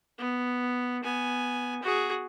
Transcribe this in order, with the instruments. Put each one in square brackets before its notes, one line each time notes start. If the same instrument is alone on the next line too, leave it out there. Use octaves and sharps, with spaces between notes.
[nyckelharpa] B3
B3 G#5
F#4 G#4